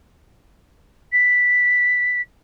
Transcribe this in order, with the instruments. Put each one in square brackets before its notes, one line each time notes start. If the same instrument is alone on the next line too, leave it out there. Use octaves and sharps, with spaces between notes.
[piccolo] B6